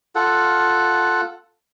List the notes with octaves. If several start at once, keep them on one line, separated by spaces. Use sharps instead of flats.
F4 A4 F#5